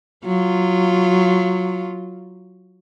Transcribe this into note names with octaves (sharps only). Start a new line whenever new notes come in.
F#3 F4